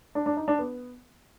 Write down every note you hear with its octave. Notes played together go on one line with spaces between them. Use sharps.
D4
D4
D#4
D4
B3